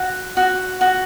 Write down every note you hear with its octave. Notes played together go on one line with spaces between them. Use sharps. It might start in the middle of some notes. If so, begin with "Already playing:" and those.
Already playing: F#4
F#4
F#4